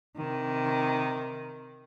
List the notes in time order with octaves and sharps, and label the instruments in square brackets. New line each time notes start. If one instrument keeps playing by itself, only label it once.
[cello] C3 D#3